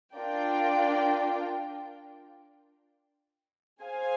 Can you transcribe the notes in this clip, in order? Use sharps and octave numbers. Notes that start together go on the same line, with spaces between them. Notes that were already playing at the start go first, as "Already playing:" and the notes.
D4 F4 A#4 D5 G5
G#4 C5 F5 G#5